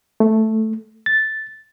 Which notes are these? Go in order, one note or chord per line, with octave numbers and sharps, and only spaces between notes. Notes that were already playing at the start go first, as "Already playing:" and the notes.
A3
A6